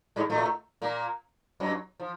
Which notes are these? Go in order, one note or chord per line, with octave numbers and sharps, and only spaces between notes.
G#2 G#3
A2 A3
A#2 A#3
F#2 F#3
F3